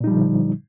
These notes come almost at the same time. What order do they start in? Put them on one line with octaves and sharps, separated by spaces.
A#2 D#4 G3 F3 D3